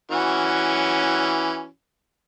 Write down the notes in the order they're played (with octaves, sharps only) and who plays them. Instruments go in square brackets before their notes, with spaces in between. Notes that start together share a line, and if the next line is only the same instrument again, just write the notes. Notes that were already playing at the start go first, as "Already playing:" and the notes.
[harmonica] E3 C#4 F#4